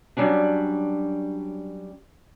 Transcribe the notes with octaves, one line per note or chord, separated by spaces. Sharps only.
F#3 G3 C#4 D4